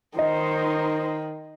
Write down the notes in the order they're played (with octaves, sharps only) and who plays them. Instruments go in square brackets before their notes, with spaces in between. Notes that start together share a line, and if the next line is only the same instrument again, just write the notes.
[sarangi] D#3 [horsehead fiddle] D#4 C5 [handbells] D#5